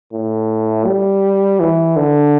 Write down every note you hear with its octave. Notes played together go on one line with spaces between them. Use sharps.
A2
G3
E3
D3